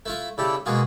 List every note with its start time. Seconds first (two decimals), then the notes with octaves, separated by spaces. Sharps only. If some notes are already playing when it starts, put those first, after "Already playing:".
0.06 A3 E4 F4
0.38 C#3 E4 G4 A4 D5
0.66 B2 G#3 A#3 F4 F#4 G#4